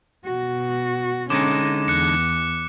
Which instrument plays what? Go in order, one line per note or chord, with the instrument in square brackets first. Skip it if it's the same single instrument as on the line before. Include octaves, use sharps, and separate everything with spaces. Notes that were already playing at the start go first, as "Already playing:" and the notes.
[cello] B2 F#4
[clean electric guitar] D3 G#3 D#4 [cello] C#4 [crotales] D6
[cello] E2 [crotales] F#6 C#7